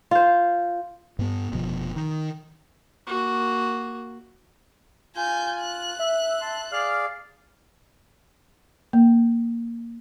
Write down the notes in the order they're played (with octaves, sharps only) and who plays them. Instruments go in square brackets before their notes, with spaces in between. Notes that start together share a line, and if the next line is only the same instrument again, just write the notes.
[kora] F4 C5
[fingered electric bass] G2 B3
F1 B2 F3
D#3
[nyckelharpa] A#3 F#4
[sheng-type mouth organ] F4 [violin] G#5 G6
[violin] F#6
[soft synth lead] E5
[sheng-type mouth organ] A5 C6
[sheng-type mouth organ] G#4 D5 F5 [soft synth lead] F6
[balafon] A#3